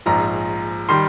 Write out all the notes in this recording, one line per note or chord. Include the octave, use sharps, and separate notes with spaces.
A#1 G#2 F3 A#5
D#3 G3 C6